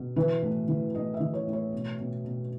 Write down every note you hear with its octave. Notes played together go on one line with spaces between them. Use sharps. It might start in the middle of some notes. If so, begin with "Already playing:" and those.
Already playing: B2
E3 B4
A2
E3
A2 D#5
E5
E3
C#5
A2
C#5
B2
B2
B2